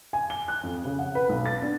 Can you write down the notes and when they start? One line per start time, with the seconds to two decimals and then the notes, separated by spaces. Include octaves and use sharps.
0.13 G#5
0.30 G7
0.48 F#6
0.63 F2
0.85 C#3
0.99 F#5
1.15 B4
1.29 B1
1.46 A6
1.62 D4